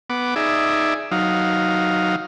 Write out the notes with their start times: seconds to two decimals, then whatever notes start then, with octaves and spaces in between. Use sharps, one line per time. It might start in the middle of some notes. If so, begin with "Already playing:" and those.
0.10 B3 F#5 D6
0.36 D#4 G#4 D5 E5
1.11 F#3 D#4 F5